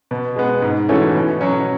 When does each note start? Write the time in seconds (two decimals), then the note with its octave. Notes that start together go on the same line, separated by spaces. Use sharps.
0.11 B2
0.36 G#3 B3
0.62 G#2
0.89 E3 A3 C#4 F#4
1.15 B2
1.41 F#3 C#4